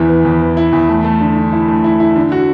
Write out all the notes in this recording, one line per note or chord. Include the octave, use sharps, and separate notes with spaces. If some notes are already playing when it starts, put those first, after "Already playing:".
Already playing: E2 E3 E4
B3
E2
B3
E4
E2
A3
A3
D3
D3
E4
A3
E4
E4
D3
F#4